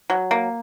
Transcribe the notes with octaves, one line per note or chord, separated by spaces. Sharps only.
F#3
A#3